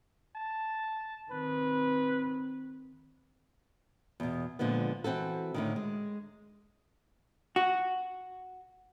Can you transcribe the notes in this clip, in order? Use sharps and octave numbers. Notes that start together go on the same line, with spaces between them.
A5
D#3 C4 B4
E2 B2
A#2 D3 F3 G#3 B3
E3 C4 F#4 A4
A2 D3 D#3
G#3
F#4